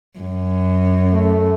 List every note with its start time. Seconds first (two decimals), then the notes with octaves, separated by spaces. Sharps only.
0.19 F#2
1.13 A3